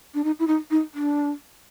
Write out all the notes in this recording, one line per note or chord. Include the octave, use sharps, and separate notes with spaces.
D4
D#4
E4
D#4
D#4
D4